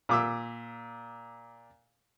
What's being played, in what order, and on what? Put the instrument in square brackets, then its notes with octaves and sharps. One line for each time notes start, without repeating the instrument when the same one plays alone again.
[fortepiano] A#2 D6 E6